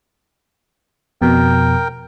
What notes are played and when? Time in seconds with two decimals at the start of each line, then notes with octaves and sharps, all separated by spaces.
1.22 F2 B2 A#4 G5